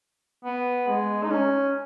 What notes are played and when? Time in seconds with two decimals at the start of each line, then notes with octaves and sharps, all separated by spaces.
0.45 B3
0.88 G#3
1.24 D#4
1.31 C#4